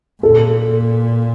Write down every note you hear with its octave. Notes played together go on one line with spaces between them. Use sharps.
A#2 A4